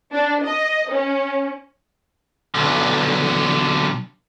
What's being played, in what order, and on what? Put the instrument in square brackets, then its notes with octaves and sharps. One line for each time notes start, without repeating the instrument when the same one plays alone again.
[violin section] D4
D#5
C#4
[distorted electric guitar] B1 D3